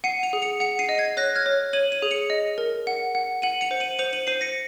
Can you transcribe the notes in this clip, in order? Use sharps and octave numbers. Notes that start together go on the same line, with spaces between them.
F#5 C7 D#7
C#7 F7
G#4
C#7 F7
F#5 C#7 F7
C7 D#7
D#5
G#6 C7
C#5 F#6 A#6
F6 G#6
C#5
C#5 D#7 F#7
D#7 F#7
G#4
C#7 F7
D#5
A#4
F#5
F#5
F#5 D#7 F#7
C#7 F7
C5
D#7 F#7
C5 C#7 F7
D#7 F#7
C5 C7 D#7
A#6 C#7